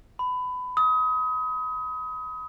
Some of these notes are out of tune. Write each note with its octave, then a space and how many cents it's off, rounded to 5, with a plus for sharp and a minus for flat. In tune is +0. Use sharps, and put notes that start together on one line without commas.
B5 +20
D#6 +30